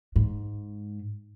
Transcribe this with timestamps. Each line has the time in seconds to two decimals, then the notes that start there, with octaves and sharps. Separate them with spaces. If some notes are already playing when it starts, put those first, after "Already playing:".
0.16 G#2